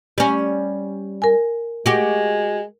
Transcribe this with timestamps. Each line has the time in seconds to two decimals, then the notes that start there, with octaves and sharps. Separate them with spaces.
0.18 G3 C#4
1.22 A#4 G#5
1.86 G#3 F#4 G4